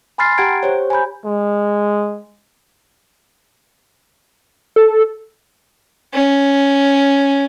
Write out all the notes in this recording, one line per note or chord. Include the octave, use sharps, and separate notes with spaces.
G#5 B5 C6 F6 A6 C7
G4 F#5 G5 A#5 G#6 D7
G4 C5 C#5
G#5 A#5 B5 G6
G#3
A4
C#4